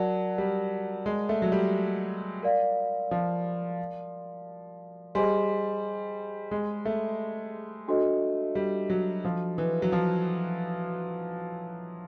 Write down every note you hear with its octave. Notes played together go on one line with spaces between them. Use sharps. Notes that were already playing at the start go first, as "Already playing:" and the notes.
Already playing: F#3 A#4 D5 F#5 A5
G3
G#3
A3
F#3
G3
A#4 D5 F5
F3
G3 G#4 C5 D#5 G#5 C6
G#3
A3
D4 F#4 A4 C5 D#5
G3
F#3
F3
E3
F#3
F3